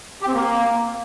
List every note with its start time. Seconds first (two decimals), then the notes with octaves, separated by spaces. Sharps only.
0.22 G4
0.28 C4
0.33 A#3